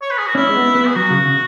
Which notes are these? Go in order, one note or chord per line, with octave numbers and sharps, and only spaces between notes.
C#5
B4
G#4
F#4
C#4 E4
G#3
B3
B3
G#4
F#3 F#4
C#3
C#3